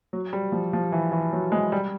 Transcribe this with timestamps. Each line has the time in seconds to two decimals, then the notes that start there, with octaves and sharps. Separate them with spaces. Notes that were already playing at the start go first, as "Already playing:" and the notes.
0.13 F#3
0.33 G3
0.52 F3
0.73 F3
0.92 E3
1.12 E3
1.33 F#3
1.52 G#3
1.72 G3